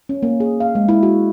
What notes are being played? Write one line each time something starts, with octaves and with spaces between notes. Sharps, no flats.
C#4
A#3
G#4
F5
G#3
E4
F#4